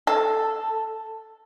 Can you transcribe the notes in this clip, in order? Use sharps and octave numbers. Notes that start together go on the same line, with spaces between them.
A4